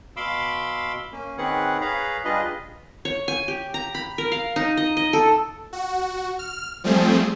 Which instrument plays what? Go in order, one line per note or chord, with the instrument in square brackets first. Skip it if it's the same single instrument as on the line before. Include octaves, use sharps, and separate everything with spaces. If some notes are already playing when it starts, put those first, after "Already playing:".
[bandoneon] B2 F5 B5 C6 D6 E6
A#3 C#4
D#3 C4 G#4 B4 C#5 F#5
G#4 B4 C#5 F5 A#5 B5
G3 D4 F4 G#4 B4 D#5
[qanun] C#5
G#5
G4
A#5
B5
A#4
F5
D#4
D#5
D#5
A4
[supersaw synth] F#4
F6
F3 G3 A3 C4 G#4